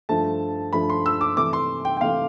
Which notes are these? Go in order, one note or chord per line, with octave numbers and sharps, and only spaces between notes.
G2 F3 A3 A5
G2 F3 A3 B5
C6
E6
D6
C3 E3 A3 D6
C6
G5
G5
C3 E3 A3 F5